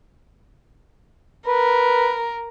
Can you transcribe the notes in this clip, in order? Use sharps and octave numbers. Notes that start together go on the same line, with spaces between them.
A#4 B4